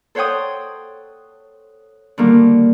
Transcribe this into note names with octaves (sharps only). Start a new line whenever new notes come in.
A4 C5 C#5 F#5 G5 D#6
D3 D#3 G3 A#3